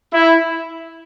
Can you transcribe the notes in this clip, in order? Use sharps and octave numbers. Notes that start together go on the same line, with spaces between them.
E4